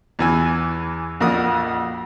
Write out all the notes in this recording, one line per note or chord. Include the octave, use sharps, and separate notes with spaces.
E2 E3 G#5
A#1 F2 A#2 F#4 A#4 D#6